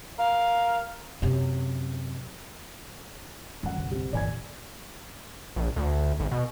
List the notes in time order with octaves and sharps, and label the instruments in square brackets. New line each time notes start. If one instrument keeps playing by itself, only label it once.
[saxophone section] A#4 F5
[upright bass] F#2 C3
[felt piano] D#1 F#5 [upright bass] F#2 F#3
[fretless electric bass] F#1 [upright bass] B1
[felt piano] G3 C4
[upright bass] G1 E2 [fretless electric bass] A#2 E3 [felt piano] D5 G#5 G#6
[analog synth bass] A#1
D2
G#1
B2